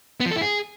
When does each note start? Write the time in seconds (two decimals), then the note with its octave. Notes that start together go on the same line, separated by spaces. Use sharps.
0.20 B3
0.26 F3
0.31 A4
0.36 E4
0.41 G#4